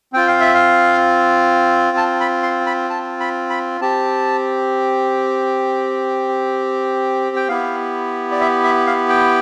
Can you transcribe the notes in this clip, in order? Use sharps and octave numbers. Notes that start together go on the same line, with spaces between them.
C4 F4 G5
F5
E5
F5
A5
B5
C6
B5
A5
B5
B5
C4 G4 A5
G5
B3 E4 G4 F5
D5
E5
E5
F5
G5